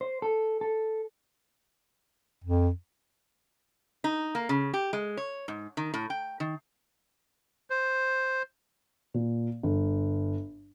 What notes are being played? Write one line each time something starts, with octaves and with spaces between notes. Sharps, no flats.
C5
A4
A4
F2
D#4
A#3
C#3
G4
G#3
C#5
G#2
D#3
A2
G5
D#3
C5
A#2
G1